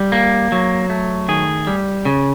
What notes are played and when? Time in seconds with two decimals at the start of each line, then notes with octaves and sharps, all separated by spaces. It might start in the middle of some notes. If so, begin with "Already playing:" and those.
Already playing: G3
0.12 A#3
0.52 F#3
0.90 A3
1.28 D#3 G#4
1.67 G3
2.05 C#3